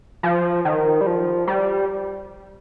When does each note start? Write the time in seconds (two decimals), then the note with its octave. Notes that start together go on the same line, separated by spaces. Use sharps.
0.23 F3
0.65 D#3
1.01 G3
1.07 F3
1.47 G3